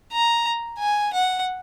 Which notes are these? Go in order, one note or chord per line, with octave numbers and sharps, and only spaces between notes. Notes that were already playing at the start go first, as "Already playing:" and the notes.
A#5
G#5
F#5